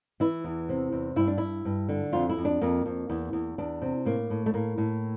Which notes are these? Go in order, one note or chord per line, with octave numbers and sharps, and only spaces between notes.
E3 E4
E2
C3
E2
G2 E4
D4
G2 E4
G2
D3
F2 F4
E4
F2
D4
F2 A#3
F2
E2
E2
E2 D4
C3
A2 A#3
A2
A3
A2 A#3
A2